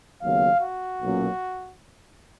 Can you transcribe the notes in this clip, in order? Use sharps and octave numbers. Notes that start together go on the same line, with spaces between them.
D#2 C#3 F#3 B3 F5
F#4
B1 A#2 F#3 A#3 C#4